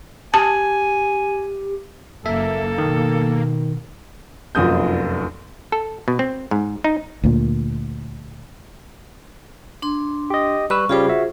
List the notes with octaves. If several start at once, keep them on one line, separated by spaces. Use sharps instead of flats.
G4 G#5 A5
F#1 A#3 A4 E5
B2 D#3
F1 A#1 F#2 D#6 G6
A4
B2
C4
G#2
D#4
D2 A#2
D4 C6
G4 D#5
G3 B4 C#6 E6
C#3 G3 F4 G4 G#4 C5
F#4 E5